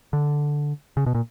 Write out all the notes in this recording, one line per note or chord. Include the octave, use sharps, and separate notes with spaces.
D3
C#3
B2
A#2